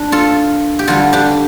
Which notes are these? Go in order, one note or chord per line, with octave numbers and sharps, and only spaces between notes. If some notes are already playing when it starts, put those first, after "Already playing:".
Already playing: D4
F4 A4
G4
D3 G3 F4 A4
D4 G4